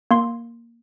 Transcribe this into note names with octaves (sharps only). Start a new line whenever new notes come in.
A#3 C6